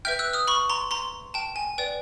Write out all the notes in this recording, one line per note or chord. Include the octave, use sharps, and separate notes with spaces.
B4 E5 G5 F6 G6
E6 F#6
D#6 F6
B5 C#6
A#5 C6
A#5 C6
G5 A5
G#5
B4 D5 G5